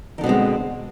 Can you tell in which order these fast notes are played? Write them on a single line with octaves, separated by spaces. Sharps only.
D#3 D3 B2 C4 G#3